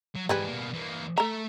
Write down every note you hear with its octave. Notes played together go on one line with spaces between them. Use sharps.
F#3
G#2 E3 G3 G#4 B4
B2 A#3
E3 A#3
A3 A4 E5 A#5